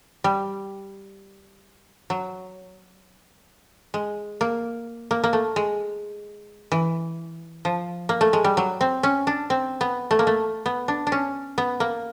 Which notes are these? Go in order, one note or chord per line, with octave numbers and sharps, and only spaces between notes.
G3
F#3
G#3
A#3
A#3
A#3
A3
G#3
E3
F3
A#3
A3
G#3
G3
F#3
C4
C#4
D4
C4
B3
A3
A#3
A3
B3
D4
D4
C#4
B3
A#3